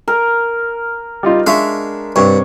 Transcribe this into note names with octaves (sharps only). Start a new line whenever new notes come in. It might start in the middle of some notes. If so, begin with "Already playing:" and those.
A#4
G3 D#4 F4
G#3 D4 E5 F5 C#6
G2 C3 C#5